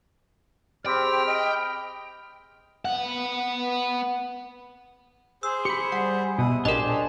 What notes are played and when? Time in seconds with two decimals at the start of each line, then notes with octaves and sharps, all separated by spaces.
0.86 C4 G4 G#4 G5 B5 F6
1.27 D#5
2.85 B3 F#5
5.43 G#4 C5 E6
5.65 G4 B5 C#7
5.92 G3 F#5
6.39 B2 E4 D#6
6.65 A#1 D4 G4 G#4 A#4 C5 D#5
6.89 C#5 A5